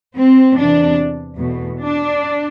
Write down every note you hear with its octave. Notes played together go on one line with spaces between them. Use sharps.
C4
E2 C3 E3 D4
E2 B2 A3
D4